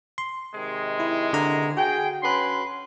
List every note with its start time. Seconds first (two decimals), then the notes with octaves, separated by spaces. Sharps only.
0.18 C6
0.55 C3 D#3 G#3
1.00 E4
1.33 D3 A#5
1.77 F#4 G#4 G5
2.22 C#4 B4 C6